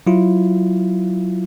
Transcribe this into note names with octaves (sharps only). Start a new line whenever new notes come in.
F#3 E4 F4